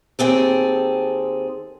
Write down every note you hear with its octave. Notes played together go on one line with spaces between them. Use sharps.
D#2 C4 G#4 A4